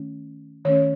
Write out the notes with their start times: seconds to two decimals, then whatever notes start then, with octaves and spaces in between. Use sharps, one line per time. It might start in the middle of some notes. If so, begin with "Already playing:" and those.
Already playing: D#3 A3 C#4
0.65 D#3 A3 C#4 C#5